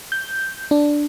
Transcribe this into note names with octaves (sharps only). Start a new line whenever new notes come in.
G6
D4